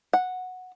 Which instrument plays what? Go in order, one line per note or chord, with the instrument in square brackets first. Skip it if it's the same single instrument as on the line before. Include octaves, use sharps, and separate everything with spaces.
[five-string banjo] F#5